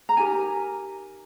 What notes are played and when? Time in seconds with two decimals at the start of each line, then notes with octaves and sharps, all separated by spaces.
0.09 A#5
0.17 D#4 G4 A#4 G#5